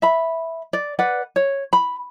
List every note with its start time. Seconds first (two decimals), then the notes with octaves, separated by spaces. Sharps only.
0.02 E5 B5
0.73 D5
0.99 B4 D5 F#5
1.36 C#5
1.73 B5